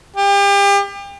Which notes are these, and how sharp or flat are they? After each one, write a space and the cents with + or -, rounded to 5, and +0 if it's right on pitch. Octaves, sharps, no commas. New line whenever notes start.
G4 +35